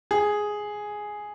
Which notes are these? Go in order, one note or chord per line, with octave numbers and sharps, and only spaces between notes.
G#4